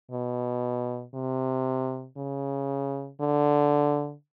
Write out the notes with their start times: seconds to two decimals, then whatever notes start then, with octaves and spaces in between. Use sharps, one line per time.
0.11 B2
1.14 C3
2.17 C#3
3.21 D3